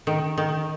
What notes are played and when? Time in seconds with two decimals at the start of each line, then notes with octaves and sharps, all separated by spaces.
0.07 D#3
0.38 D#3